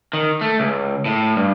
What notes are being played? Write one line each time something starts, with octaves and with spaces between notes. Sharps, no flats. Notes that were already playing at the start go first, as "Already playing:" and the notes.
D#3
A3
C#2
A2
G2